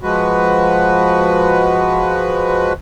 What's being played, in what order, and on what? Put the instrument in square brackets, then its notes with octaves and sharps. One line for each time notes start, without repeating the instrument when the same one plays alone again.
[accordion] F3 G#3 F#4 B4